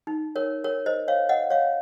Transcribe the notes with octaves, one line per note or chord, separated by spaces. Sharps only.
D#4
A#4 C#5
A#4 C#5
C5 D#5
C#5 F5
D#5 F#5
C#5 F5